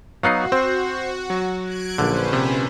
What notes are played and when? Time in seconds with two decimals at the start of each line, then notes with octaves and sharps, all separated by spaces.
0.23 F#3 B3 D#4 F#4 F5 F#6 C7
0.52 C4 C5
1.30 F#3
1.62 F#6 G#6 D7
1.98 A#1 D3 C#4 B4 C5
2.33 C3